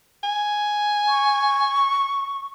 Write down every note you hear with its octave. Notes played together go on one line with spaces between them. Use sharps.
G#5
C#6